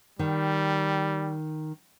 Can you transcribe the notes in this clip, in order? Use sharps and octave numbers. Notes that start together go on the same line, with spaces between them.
D#3 G3